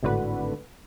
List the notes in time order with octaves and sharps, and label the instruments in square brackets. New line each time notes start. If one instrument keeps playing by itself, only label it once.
[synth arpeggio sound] G#1 A2 D3 F#4 B4